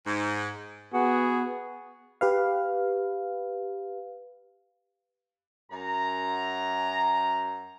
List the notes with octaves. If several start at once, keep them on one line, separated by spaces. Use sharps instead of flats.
G#2
B3 F#4 G#4
G4 B4 F5
F#2 A#5